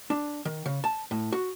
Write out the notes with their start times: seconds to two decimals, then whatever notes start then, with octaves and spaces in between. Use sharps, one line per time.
0.10 D4
0.45 D#3
0.66 C#3
0.84 A5
1.11 A2
1.32 F#4